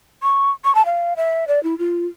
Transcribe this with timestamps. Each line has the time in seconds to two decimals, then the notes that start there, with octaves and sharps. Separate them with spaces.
0.23 C#6
0.65 C#6
0.75 A5
0.85 F5
1.17 E5
1.48 D5
1.63 E4
1.79 F4